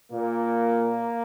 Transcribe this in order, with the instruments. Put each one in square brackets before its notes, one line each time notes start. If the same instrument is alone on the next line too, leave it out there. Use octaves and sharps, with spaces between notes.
[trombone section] A#2 A#3